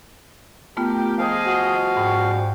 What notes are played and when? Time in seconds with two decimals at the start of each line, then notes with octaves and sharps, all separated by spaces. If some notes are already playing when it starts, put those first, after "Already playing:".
0.77 A3 B3 F4 G4 A#4 G5
1.18 F3 G#4 D#5 F5
1.47 F#4
1.97 G#2 G3 C#4 G5